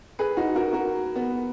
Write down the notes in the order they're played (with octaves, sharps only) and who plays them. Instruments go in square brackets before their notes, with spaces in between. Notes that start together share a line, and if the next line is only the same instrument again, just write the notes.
[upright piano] G#4 B4
D#4 F#4
F#4 A#4
F#4 A#4
B3